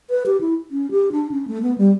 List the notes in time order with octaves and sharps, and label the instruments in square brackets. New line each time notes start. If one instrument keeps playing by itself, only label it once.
[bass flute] B4
G4
E4
C#4
G4
D4
C#4
A3
B3
G3